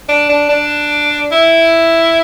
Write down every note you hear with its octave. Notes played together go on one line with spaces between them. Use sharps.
D4
D4
D4
E4